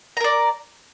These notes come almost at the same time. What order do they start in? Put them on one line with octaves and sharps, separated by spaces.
A#5 A#4 D5